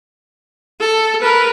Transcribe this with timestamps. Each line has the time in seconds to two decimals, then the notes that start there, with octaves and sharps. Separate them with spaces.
0.80 A4
1.21 A#4 B4